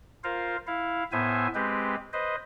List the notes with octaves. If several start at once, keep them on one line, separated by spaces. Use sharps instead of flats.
F4 A#4 C5 F5
E4 F5
A2 B3 C5 E5 G#5
G#3 C4 G4 B4
B4 C5 D#5